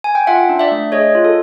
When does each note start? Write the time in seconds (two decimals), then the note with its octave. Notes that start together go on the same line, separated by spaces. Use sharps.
0.04 G#5
0.15 G5
0.27 F4 E5 F#5
0.49 D4
0.59 D5 E5
0.71 A3
0.92 G#4 C#5 D#5
1.15 F4
1.25 A4